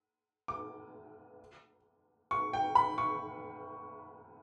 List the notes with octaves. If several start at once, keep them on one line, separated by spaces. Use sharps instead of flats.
D6
C#6
G5
B5
C#6